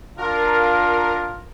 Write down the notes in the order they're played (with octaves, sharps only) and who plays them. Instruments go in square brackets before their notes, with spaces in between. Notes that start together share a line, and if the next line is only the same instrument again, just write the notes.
[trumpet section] D4 F4 [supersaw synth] A#4